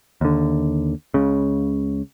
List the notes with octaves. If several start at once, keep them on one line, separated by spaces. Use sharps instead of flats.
D#2 D3
C#2 C#3